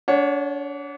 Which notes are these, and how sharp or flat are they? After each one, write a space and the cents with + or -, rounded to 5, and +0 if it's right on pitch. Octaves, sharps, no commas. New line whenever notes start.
D4 -35 C#5 +0 F#5 +0